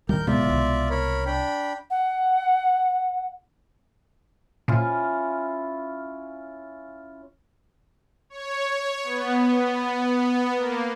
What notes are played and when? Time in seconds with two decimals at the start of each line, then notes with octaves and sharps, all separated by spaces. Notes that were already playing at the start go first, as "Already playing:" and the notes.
0.09 D1 D#2 G3 A#4 G6
0.27 D1 B2 G#3 B3 F4 D5 E5
0.49 C2
0.90 A#4 C#5 B5
1.26 D4 G5 B5
1.90 F#5
4.68 A#2 C#4 E4 F4
8.30 C#5
9.04 B3
10.56 A#3